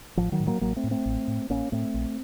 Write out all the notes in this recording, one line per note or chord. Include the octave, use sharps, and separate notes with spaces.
A1 F3
D#3 F#3
A2
F#3 A#3
A1 F#3 A#3
A3 C4
A2
A3 C4
A1
A2
A1 A#3 C#4
A2 A3 C4
A#1